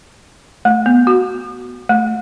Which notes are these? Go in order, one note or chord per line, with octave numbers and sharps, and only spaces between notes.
A3
B3
F#4
A3